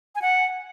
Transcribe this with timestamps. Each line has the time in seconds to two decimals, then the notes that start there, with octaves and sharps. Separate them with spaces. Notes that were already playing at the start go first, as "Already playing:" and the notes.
0.15 G#5
0.22 F#5